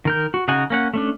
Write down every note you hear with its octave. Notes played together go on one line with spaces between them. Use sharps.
D#3 A#4 G6
F#4
C#3 D#4 F#4 F#5 G#5
A#3 C#4 F#5
A3 C#4 D4